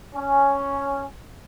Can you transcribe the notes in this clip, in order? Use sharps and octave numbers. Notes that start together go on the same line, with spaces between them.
C#4